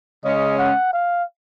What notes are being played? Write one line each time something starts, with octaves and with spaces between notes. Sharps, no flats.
C#3 G#3 C#4 D#5
F#5
F5